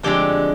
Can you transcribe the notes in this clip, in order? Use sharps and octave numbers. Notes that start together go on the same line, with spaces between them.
F2 D3 G#3 G4 G5